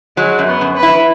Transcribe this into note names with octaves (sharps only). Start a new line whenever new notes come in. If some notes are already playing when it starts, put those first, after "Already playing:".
F#3 G#3
F#2
B3
F#2
B4
E4